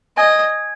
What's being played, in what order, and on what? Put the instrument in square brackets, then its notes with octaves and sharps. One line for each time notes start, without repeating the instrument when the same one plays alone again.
[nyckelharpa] D#5 [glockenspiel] G#5 G#6